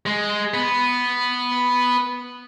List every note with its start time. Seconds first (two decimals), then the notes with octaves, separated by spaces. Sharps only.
0.06 G#3
0.54 B3